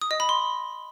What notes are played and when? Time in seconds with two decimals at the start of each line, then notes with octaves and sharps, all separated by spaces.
0.02 D#6
0.11 D#5
0.20 B5
0.29 C6